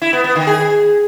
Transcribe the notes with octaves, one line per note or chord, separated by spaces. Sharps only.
E4
B3
B3
D#3
G#4